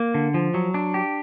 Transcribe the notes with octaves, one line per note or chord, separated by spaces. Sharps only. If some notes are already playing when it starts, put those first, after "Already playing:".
Already playing: A#3
D3
F3
F#3
D4
G4